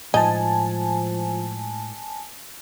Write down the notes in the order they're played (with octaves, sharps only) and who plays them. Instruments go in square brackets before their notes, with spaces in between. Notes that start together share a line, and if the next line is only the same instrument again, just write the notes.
[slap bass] A2 G#3 [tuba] F3 [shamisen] D#4 [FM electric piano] G#5 A5